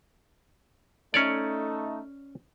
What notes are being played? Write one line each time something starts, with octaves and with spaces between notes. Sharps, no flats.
A3 C#4 D#4 C#5 D5